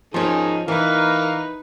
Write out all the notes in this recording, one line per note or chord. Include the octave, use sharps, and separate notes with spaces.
D#3 F3 C#4 D#4 G#4
E3 D#4 A#4 B4 F5